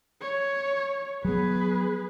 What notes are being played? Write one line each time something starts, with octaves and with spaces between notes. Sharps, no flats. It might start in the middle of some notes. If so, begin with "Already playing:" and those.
C#5
F#3 B3 G#4 B4